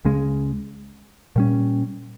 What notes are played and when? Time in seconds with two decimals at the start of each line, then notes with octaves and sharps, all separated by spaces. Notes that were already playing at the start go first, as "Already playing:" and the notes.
0.05 C#2 C#3 G#3
1.36 A#2 G3 C#4